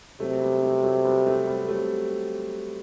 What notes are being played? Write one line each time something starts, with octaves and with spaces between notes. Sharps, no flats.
C3 F#3 A3
G3 B3
A3 C4
F#3 A3
G3 B3
A3 C4
G3 B3
F#3 A3